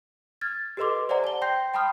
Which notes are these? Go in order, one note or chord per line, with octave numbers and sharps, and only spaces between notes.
F6 G#6 A6
G4 A4 B4 D#5 C6 D6
C5 D5 E5 F#5 G#5 A#5
A5 G7
G5 C6 G6 A#6 C7
G5 A5 B5 C6 D#6 F6